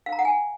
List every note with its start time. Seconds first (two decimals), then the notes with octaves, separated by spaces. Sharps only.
0.06 F5
0.12 A#5
0.19 F#5
0.25 G#5